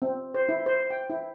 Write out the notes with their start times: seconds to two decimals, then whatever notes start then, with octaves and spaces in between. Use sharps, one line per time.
0.02 C4
0.34 C5
0.49 E4
0.66 C5
0.90 G5
1.10 E4